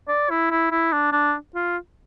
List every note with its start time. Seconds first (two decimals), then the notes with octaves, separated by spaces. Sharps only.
0.08 D5
0.30 E4
0.51 E4
0.71 E4
0.92 D4
1.12 D4
1.55 F4